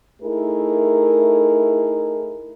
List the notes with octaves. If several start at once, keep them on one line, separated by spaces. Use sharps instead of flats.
A3 D#4 E4 G#4 A#4